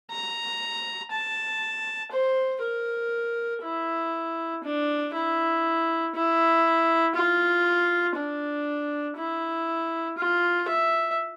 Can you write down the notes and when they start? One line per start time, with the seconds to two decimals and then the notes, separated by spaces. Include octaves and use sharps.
0.11 A#5
1.12 A5
2.12 C5
2.63 A#4
3.63 E4
4.64 D4
5.15 E4
6.15 E4
7.16 F4
8.17 D4
9.17 E4
10.18 F4
10.68 E5